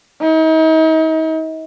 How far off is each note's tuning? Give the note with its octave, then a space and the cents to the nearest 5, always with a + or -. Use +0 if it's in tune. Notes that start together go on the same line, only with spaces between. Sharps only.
D#4 +40